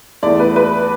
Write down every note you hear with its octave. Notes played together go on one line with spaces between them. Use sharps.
E2 E3 A3 D5
B4
B4